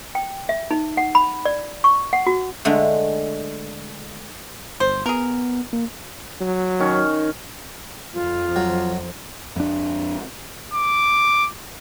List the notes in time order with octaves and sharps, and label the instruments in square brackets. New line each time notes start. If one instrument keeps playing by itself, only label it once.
[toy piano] G5
E5
D#4
F#5
B5
D5
C#6
F#5
F#4
[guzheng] D3 G#3 A3
[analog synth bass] G1 [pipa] C5
[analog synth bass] B3 [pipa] G#4 A#4
[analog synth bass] A#3
[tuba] F#3
[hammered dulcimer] D#3 C#4
[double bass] F2 F3 [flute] F4
[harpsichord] F#3
[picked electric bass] F2 D4
[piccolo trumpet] D6